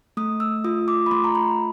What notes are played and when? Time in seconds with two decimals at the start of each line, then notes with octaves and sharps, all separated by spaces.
0.17 A3 D#6
0.40 E6
0.64 F4 D#6
0.88 D6
1.06 B5
1.11 A3 C6
1.24 A#5
1.35 B5